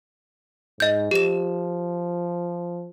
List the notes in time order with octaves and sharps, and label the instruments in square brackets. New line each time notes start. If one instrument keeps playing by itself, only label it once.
[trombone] G#2 [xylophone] D#5 G6
[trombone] F3 [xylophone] G4 E7